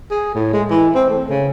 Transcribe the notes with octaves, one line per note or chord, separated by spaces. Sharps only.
G#4
A2
G#3
E3
C4
A3
C#3